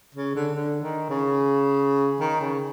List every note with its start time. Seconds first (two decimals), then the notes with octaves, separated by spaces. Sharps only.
0.14 C#3
0.35 D3
0.55 D3
0.82 D#3
1.10 C#3
2.20 D#3
2.41 C#3